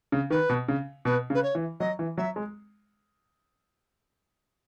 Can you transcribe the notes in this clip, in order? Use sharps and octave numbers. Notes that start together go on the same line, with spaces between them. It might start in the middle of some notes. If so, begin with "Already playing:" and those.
C#3
D#3 B4
B2
C#3
B2 B4
C#3
B4
C#5
E3
F#3 D#5
E3
F#3 E5
G#3